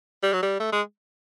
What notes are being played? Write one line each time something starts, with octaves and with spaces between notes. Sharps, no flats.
G3
F#3
G3
A3
G#3